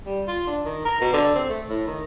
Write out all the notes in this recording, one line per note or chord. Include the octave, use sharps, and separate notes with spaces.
G3
F4
D4
D#3
A#4
B2
D3
C4
A3
A2
D#3